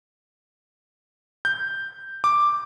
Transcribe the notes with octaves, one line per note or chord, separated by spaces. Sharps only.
G6
D6